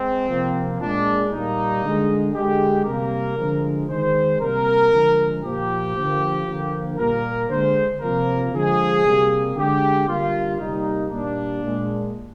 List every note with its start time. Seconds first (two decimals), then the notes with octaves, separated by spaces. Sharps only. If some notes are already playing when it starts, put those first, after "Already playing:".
Already playing: G#3 C4
0.28 C3 F3 A#3
0.79 A#2 G#3 D4
1.31 A#2 G3 A#3 D#4
1.83 D3 G#3
2.34 D3 G#3 G4
2.86 C3 G3 A#3 A#4
3.37 D3 F3 G#3
3.89 D#3 G#3 C5
4.40 C3 G3 A#3 A#4
4.92 D3 F3 G#3
5.43 A#2 F3 A#3 G4
5.96 D3 F3 A#3
6.46 D3 F3 A#3
6.98 A#2 G3 A#3 A#4
7.50 D3 G#3 C5
8.01 C3 F3 A#3 A#4
8.53 D3 F3 G#3 G#4
9.05 C3 G3 A#3
9.56 D3 G#3 G4
10.07 D3 G3 A#3 F4
10.59 C3 G3 A#3 D#4
11.10 A#2 G3 A#3 D4
11.62 A#2 G#3